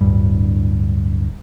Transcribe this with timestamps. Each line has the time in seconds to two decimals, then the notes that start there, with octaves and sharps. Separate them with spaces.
0.01 D1 G2